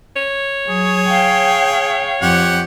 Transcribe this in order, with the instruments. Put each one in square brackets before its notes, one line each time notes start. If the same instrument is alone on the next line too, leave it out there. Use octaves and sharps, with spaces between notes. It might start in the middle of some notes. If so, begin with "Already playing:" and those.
[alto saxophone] C#5
[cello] F#3 [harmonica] G#4
[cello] F5 G5
[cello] F2 [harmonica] G4 F#5